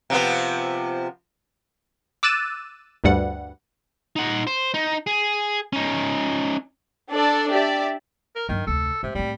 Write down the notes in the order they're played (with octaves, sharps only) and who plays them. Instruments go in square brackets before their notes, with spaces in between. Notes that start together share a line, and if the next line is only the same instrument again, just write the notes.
[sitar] C3 F3 B3
[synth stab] D6 E6 F#6 A6 D#7 E7
D2 G2 G3 F#5
[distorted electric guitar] D#4 F#5
C5
D#4
G#4
C#4 D#4
[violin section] D4 A4 D5 A5
G4 D5 E5
[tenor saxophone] A#4
[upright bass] G2 F#3 [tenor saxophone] D#3
[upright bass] F1 D2 [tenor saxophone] A4
[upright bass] G#2 [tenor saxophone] C3
[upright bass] A2 C4 [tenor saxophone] G3